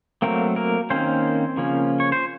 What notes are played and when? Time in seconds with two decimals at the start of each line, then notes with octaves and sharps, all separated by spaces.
0.22 F#3 A3 A#3 C4 A#4
0.56 A#3 A#4
0.90 D#3 A#3 C4 C#4 C5
1.57 C#3 F3 A#3 C#4
2.00 C#5
2.12 C5